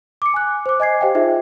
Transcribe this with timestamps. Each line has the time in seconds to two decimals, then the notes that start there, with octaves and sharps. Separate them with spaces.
0.22 D6 C#7
0.34 G#5 F#6
0.66 C5 D6
0.80 D#5 G#5 G#6 C7
1.01 G4 C5 D#5 F5 G5
1.15 D#4 F4 G#4 C5 E5